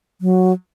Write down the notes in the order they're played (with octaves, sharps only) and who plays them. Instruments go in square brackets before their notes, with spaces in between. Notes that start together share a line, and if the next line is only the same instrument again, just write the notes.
[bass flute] F#3